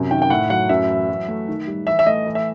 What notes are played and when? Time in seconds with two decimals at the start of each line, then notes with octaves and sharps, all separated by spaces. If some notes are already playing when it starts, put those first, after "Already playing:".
Already playing: F#2 C3
0.11 D#3 G5
0.22 G5
0.30 A2 F#5
0.50 F#3 F#5
0.69 F#2 E5
0.89 E3
1.09 F#3
1.28 A3
1.48 D#3
1.67 G3
1.87 E3 E5
1.99 E5
2.06 A3 D#5
2.26 E3
2.35 E5